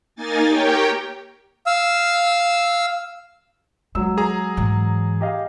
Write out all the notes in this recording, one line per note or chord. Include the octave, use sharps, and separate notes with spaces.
A#3 D#4 G#5 A6
G4 A#4 C#5 G5
F5 E6
F#3 G#3 E6
G#4 A#5
G#2 E3
G4 D#5 F5